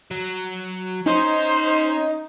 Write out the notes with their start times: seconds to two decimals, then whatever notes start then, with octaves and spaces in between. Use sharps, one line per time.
0.11 F#3
1.06 C#4 D#4 C5